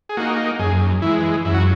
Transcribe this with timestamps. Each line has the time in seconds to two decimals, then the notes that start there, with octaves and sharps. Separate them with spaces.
0.09 G#4
0.17 A#3 D#4 F#4
0.59 F#2 G#4
1.02 E3 G#3 E4
1.45 F#2 E4
1.54 F#4